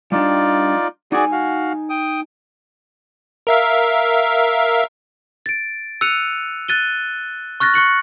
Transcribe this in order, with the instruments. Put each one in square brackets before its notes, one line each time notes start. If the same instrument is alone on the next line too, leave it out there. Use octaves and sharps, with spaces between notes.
[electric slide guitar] G3 D4 [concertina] D#4 F4 D5
[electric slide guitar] D#4 G#5 [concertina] F#4 G#4 D5
[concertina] F#4 F5
G5 D#6
[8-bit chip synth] A#4 E5 F5
[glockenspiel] A6 D7
E6 F#6 C#7 D#7 F7
F#6 A6 D#7 G7
C#6 F6 F#6 A6 A#6
C#6 F#6 C#7 F#7